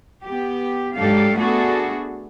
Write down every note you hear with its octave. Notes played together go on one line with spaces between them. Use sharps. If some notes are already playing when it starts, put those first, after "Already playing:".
B3 G4
G#2 F#3 D4 G4 A4 F5
A3 B3 D4 F#4 G#4 A4